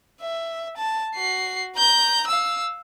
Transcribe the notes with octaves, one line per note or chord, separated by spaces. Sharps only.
E5
A5
F#4 C7
A#5 G6
F5 E6